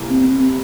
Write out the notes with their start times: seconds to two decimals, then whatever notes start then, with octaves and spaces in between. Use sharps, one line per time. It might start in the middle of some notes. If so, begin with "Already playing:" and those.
Already playing: C2 C3 E3 A#3
0.10 C4